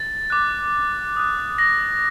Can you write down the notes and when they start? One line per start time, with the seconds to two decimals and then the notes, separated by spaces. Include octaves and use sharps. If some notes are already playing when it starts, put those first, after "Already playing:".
Already playing: A6
0.30 D6 F#6
1.17 D#6 F#6
1.58 A#6